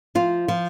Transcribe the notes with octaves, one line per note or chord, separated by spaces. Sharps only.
F3 F4
F3